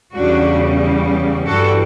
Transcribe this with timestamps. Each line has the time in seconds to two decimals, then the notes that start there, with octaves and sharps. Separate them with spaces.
0.14 E2 C#3 G3 D4 F#4
1.46 G2 E3 G3 F#4 A4